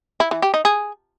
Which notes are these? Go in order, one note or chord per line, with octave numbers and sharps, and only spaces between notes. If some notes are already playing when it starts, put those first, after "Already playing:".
E4
E3
G4
D#4
G#4